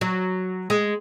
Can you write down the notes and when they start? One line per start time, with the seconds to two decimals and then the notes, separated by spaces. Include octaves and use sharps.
0.01 F#3
0.70 G#3